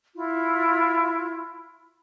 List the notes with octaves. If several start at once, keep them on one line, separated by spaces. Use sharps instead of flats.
E4 F4